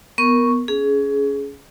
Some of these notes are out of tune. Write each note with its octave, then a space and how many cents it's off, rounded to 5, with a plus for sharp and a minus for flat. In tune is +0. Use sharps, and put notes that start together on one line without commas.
B3 +0 A#4 +0 C#6 +0
C#4 +20 G#4 +15